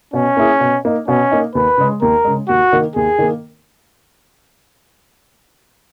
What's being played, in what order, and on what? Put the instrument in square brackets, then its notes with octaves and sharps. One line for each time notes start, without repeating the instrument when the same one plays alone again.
[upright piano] B2 [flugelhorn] C#4
[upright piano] A#3 E4 G#4
B2
A#3 D#4
[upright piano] B2 [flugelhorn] C#4
[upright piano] A#3 D#4
[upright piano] D#2 [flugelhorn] B4
[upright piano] C#3 G#3
[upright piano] D#2 [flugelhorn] A#4
[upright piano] C#3 G#3
[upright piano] D#2 [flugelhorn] F#4
[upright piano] D#3 A#3
[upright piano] D#2 [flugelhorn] G#4
[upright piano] D#3 A#3